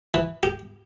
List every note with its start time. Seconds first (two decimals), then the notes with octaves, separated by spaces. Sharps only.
0.14 E3
0.43 G4